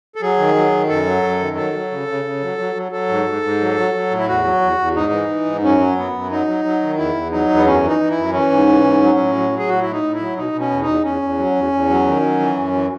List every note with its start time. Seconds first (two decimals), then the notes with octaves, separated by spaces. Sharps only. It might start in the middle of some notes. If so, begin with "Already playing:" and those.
0.16 A4
0.21 F#3 G#4
0.38 D#3
0.55 F#3
0.72 D#3
0.88 F#2 A4
1.06 F#3
1.23 F#2
1.39 D#3
1.56 F#3 A4
1.73 F#3
1.91 C#3
2.08 C#3
2.25 C#3
2.42 F#3
2.58 F#3
2.75 F#3
2.92 F#3 A4
3.09 G#2
3.26 G#2
3.43 G#2
3.60 F#3
3.76 F#3
3.94 F#3
4.11 A2
4.19 E4
4.27 E2 F#4
4.44 F#3
4.62 E2
4.79 E2
4.95 G#2 D#4
5.12 E3
5.29 E3
5.45 G#2
5.63 F#2 C#4
5.80 F#3
5.96 F#2 B3
6.13 F#2
6.31 F#3 D#4
6.47 F#3
6.65 F#3
6.82 D#3
6.98 E2 E4
7.14 E2
7.32 F#3 D#4
7.49 E2
7.56 B3
7.66 F#2 C#4
7.83 E3 D#4
8.00 E3
8.10 E4
8.17 F#2
8.33 E3 C#4
8.51 G#2
8.67 E3
8.84 G#2
9.02 F#3
9.18 A2
9.35 F#3
9.53 F#3
9.59 G#4
9.69 A2 F#4
9.81 A2 E4
9.92 D#4
10.03 A2
10.14 E4
10.19 F#3
10.36 B2 D#4
10.53 B2
10.60 C#4
10.71 E2
10.82 D#4
10.88 E2
11.04 E2 C#4
11.22 E2
11.38 F#3
11.55 E2
11.72 E2
11.90 F#3
12.06 D#3
12.22 F#3
12.40 E3
12.56 F#2
12.73 E3